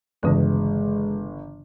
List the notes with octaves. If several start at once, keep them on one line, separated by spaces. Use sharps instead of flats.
G1 G2 C#3 E3 G#3